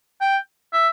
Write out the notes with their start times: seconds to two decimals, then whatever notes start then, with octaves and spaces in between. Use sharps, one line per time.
0.21 G5
0.73 E5